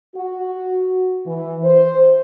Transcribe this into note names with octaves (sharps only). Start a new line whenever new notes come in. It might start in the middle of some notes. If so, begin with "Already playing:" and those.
F#4
E3
C5